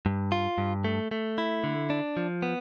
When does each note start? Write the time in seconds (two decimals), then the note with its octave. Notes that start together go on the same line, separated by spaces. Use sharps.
0.06 G2
0.32 F4
0.58 G2
0.84 A3
1.11 A3
1.38 E4
1.64 D3
1.90 D4
2.17 F3
2.42 B3